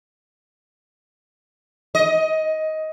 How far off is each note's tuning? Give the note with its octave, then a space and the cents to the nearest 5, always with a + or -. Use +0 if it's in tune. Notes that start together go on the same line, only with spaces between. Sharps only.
D#5 +15